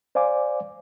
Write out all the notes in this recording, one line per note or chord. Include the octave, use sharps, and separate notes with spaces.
C5 D5 F5 G#5 D6